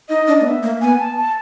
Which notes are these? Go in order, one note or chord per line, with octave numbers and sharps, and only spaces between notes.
D#4 D#5
D4
A#3
B3 E5
A#3
B3 G#5
A5
A5